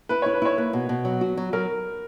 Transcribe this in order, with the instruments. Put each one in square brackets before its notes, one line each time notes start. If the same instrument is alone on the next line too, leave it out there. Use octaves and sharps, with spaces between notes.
[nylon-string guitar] E4 [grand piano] B4
[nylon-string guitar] E4 [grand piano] C#5
[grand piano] B4
[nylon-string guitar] E4 [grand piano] C#5
[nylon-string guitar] A#3 [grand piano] B4
[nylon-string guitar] B2
B2
F#3
F#4
F#3
[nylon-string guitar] F#3 [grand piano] A#4